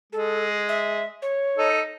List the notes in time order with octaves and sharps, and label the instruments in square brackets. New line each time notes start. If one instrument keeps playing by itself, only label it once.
[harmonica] G#3 [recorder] A4
[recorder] E5
C#5
[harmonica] D#4 A4